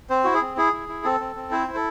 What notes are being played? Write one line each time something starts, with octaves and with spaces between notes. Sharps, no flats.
C4 C5
E4 F#4
G#4
C4
E4 G#4
E4
E4
C4 A4
C4
C4
E4 C5
E4
A4